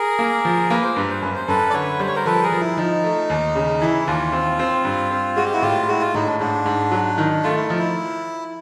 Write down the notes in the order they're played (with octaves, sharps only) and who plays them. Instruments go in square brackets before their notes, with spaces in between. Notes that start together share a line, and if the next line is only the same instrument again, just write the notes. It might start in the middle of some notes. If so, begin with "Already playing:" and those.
Already playing: [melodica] G#4 A#4
[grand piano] A#3
F3
[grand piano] A#3 [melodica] B4
[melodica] C5
[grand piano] G2 [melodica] B4
[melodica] C5
[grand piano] F#2 [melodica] B4
[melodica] C5
[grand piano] F#2 [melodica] A4 B4
[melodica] D5
[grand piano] D3 [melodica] B4 C#5
[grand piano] G3 [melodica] C5
[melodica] C#5
A#4 C5
[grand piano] F3 [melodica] A4 B4
[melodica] G#4 A#4
[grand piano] F3
[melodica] E4
[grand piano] F3 [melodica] D#4
[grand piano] A3
D#2
C#3
[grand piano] E3 [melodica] E4
[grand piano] D#2 [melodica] F4
[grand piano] C4
C4
G2
C4
[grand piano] G#3 [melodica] F#4
[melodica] G4
E4 F#4
[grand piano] A2 [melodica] F4 G4
[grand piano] G#3 [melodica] E4 F#4
[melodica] F4
[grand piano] A2 [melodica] D#4
[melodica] D4
[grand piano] G#2 [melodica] D4
[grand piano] G#2
F#3
D#3
[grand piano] A3 [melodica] F4
[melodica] E4
[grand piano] F3 [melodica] D#4
[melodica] E4